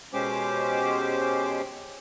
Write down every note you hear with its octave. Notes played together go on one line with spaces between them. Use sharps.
B2 G#3 C#4 G4 C5 D6